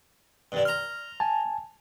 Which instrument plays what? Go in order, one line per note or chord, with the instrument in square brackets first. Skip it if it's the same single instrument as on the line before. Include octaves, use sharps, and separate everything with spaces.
[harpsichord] G2 D3
[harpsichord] A#5 C6 [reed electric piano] F6
[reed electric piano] G#5 A5